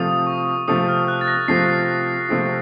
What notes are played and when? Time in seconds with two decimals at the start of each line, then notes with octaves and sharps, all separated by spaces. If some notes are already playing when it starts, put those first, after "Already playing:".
Already playing: C3 F3 A3 C4 F4 D#6
0.27 C#6
0.68 C3 F3 A3 C4 F4 D#6
0.88 F6
1.08 F#6
1.21 A6
1.28 A#6
1.48 C3 F3 A3 C4 F4 C7
2.29 C3 F3 A3 C4 F4